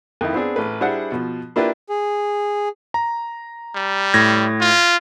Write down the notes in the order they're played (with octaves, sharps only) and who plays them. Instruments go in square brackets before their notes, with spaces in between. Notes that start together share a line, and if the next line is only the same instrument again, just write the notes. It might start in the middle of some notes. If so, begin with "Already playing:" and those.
[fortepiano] F2 D#3 E4
B3 C4 D4 G#4
A1 B4
G3 D4 E4 G#4 C5 F#5
B2 F3
A#3 D4 E4 F4 G4 B4
[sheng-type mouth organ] G#4
[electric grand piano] A#5
[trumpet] G3
[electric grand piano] A2 G#6 A#6
[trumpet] F4